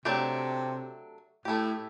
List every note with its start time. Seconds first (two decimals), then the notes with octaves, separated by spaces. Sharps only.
0.05 C3 F#3 A3 D4 G4
1.45 A2 A3 E4 G4